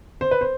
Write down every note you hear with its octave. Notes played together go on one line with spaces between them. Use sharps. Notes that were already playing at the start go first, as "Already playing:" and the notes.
C5
B4
C5